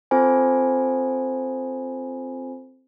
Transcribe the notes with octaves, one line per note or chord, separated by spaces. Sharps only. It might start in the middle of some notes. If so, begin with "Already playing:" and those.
C4 F4 A4 C5 G#5